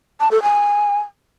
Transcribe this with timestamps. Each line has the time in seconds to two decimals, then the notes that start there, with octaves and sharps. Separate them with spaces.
0.20 A5
0.31 A4
0.43 G#5